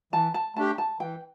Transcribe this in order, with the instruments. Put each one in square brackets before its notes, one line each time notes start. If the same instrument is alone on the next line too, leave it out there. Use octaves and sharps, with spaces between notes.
[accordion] E3 [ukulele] A5
[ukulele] A5
[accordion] A3 D4 G4 [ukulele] A5
[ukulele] A5
[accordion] E3 [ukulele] G5